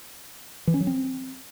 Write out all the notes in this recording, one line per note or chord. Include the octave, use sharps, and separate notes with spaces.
E3
C#4
F#3
C4